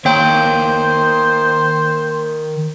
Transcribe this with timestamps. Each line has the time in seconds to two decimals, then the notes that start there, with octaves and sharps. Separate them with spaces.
0.05 D#3 A#3 C5 C#5 G5 G6